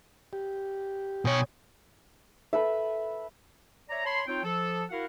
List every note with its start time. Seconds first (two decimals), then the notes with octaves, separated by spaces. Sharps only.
0.33 G4
1.25 B2 C#5 G5 G#5 D#6
2.53 A4 B4 E5
3.90 C#5 D5 E5 A#5
4.05 C#5 A5 B5 C6
4.27 C4 D#4 F4 C#5 G5
4.43 F3 A4
4.90 E4 F#4 A#4 F5 F#5